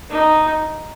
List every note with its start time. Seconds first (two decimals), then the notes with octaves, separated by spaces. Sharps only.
0.10 D#4